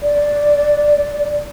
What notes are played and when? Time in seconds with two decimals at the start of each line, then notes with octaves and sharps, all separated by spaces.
0.01 D5